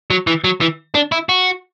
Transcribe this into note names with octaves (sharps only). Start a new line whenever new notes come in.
F#3
E3
F#3
E3
D4
E4
F#4